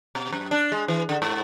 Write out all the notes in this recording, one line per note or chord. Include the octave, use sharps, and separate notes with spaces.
B2
F#2
D4
G#3
E3
D3
G#2